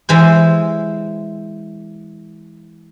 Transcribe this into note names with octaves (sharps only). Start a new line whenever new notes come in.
E3 G#3 C5